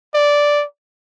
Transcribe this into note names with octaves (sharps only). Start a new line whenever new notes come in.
D5